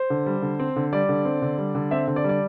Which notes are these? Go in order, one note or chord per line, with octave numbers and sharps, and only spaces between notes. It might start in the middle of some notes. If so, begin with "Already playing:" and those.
Already playing: C5
D3
G3
D3
C4
D3
G3 D5
D3
C4
D3
G3
D3
C4 E5
D3
D5
G3
D5